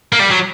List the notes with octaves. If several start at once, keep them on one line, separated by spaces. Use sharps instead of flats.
A#3
G3
F#3